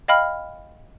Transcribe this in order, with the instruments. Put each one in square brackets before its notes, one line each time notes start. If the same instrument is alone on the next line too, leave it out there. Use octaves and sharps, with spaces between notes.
[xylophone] D#5 F5 G5 B5 F6